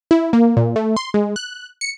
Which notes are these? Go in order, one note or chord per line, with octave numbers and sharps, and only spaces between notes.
E4
A#3
A#2
A3
C6
G#3
F#6
C#7